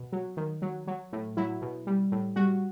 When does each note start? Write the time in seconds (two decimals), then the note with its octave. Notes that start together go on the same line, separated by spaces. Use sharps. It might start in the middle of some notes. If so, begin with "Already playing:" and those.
Already playing: B2
0.12 F#3
0.37 D#3
0.62 F#3
0.87 F#3
1.13 A2
1.37 F#3 E4
1.62 B2
1.87 G3
2.12 A2
2.36 G3 F#4